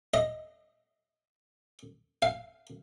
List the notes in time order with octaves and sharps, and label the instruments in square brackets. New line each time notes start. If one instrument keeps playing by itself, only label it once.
[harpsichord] D#5
F5